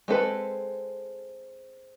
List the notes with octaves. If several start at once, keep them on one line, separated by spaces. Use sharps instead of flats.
G#3 C4 A4 B4